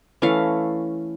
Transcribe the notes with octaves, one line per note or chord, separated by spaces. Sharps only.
E3 A3 C#4 F5